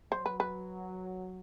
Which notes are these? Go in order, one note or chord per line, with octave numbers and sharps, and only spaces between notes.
F#3 C5
B4
B4